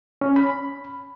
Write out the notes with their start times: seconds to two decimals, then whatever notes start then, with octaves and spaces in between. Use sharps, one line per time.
0.21 C#4
0.36 B5